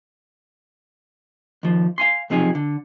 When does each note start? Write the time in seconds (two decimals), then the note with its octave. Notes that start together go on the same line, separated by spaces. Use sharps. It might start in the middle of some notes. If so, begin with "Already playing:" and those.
1.63 D#2 F3
1.98 F5 G#5 C6
2.30 B1 C3 F3 D#4 G#4
2.55 D3